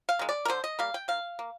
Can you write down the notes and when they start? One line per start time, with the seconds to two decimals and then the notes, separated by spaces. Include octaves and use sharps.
0.09 F5
0.19 D#3 G#3
0.29 D5
0.45 A#4
0.48 D3 C5
0.64 D#5
0.79 G3 A#3 F5
0.94 G5
1.08 D#3 F5
1.39 A#3